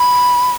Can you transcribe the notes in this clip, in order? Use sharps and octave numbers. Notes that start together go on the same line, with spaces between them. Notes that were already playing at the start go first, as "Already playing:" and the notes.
Already playing: B5